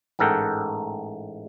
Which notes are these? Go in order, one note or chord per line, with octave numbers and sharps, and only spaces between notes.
A1 G#2 A4 A#4 F#5 G5